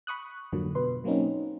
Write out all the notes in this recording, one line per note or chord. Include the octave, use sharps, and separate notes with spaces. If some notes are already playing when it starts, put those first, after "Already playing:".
B5 C#6 D#6 F#6
F2 G#2 D3 F3 F#3 A#3
B2 B4 C6
F#3 A#3 C4 C#4 D#4